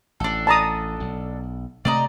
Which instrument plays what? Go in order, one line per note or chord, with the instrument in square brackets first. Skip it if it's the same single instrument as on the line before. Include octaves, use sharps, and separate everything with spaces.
[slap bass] A1 [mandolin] D4 A4
[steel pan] A5 A#5 D#6
[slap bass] B1
[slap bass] C3 A3 C4 [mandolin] D5 D#5 A#5